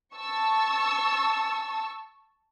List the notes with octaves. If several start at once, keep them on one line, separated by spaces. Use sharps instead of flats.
A5 C#6 E6